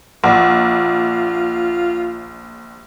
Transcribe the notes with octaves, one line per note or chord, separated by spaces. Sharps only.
A#1 F4 F#5